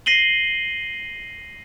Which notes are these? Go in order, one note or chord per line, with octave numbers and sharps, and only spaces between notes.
A#6 C7 D#7 F#7 G7